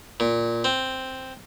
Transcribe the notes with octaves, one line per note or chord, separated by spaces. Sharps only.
A#2
C4